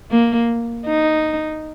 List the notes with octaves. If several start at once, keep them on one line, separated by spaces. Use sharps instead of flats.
A#3
D#4